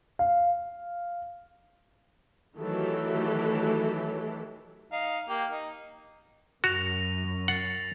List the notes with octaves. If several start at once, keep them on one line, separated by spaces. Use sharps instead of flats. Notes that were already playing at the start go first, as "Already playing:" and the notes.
F5
D#3 E3 F#3 A3 G4 A4
D#4 F5
A#3 G4
D#4
F#2 F#4 C#6 A#6 F7
F#5 A6 C7 C#7